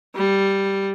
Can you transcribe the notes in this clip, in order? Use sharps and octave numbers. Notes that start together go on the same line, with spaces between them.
G3